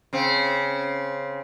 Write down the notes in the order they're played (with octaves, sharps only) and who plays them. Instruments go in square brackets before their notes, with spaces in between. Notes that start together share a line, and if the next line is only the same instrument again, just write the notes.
[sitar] C#3 C4